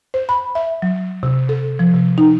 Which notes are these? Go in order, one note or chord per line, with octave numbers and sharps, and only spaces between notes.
C5
B5
E5
F#3
C3
A4
F3
C3
D#4